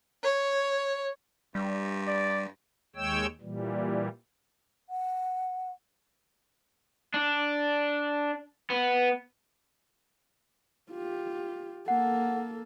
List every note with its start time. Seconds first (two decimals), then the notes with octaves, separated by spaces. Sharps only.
0.23 C#5
1.55 G2 G3
2.08 D5
2.96 D#2 G#3 C#5 G5 E6
3.41 A#2 E3 G3
4.90 F#5
7.14 D4
8.70 B3
10.91 F4 G4
11.88 A#3 A4 F#5